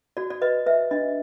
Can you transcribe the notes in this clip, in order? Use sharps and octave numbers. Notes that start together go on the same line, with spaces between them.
F#4 D5
D5
B4 D#5
B4 E5
D4 D#5